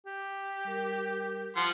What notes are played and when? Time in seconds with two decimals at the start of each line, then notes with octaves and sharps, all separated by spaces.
0.06 G4
0.65 G3 A#4
1.56 F3 F#5 C6